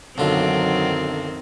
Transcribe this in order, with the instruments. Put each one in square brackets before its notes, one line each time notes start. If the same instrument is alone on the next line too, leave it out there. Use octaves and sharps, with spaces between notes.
[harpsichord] B1 D3 F4 [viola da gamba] F#2 D#3 C4 [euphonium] F#3